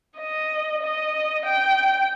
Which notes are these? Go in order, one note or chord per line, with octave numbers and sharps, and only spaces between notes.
D#5
D#5
G5